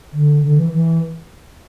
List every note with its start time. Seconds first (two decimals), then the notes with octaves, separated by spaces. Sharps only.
0.13 D3
0.43 D3
0.58 E3
0.72 E3